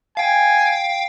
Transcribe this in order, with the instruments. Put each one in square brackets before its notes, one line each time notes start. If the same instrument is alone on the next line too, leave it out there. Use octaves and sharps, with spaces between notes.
[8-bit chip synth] F5 G5 [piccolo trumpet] G#5